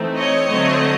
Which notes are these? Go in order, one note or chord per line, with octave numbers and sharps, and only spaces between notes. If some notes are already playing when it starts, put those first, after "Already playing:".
Already playing: E3 A3 C4 D#4
C#5 D#5
D3 F#3 A3 C4